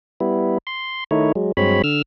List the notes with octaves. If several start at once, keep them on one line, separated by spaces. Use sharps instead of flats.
G3 B3 E4
C6
D#3 A3 D#4 E4 C#5
F#3 G#3
G2 F#3 G#3 C4 C#5 B5
D3 E6 F6